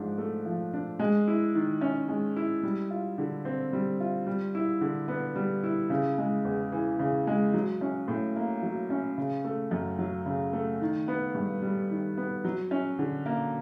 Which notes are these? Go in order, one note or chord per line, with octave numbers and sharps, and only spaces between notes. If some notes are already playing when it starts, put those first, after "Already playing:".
Already playing: G#2 F3 D4
A3
F3
D4
G#3
E4
D#3
C#4
G#3
E4
G3
F4
D3
C4
G3
F4
G3
E4
D3
B3
G3
E4
C#3
G#3
E2
E3
C#3
G#3
F#3
C#4
A2
A#3
F#3
C#4
C#3
A3
F#2
F#3
C#3
A3
D#3
B3
G2
G3
D#3
B3
F#3
C#4
D3
A#3